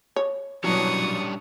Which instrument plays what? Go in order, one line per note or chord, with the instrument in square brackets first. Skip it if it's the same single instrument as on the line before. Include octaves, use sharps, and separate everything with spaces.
[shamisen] C#5
[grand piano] B2 E3 F#3 [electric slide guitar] G3 C#4 D4 [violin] C#6 D#6